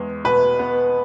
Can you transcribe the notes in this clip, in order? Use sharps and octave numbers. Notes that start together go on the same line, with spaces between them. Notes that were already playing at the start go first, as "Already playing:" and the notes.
Already playing: E2 G#3
B2 B4
B3